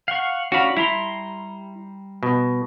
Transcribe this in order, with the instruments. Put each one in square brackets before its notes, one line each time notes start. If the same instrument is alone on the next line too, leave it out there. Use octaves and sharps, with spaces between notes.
[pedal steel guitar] F5 F#5 C#6
[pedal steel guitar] C#4 D4 B5 [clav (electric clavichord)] F#4 F5
[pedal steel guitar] G3 A#5 C6 [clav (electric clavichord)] E4
[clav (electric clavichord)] B2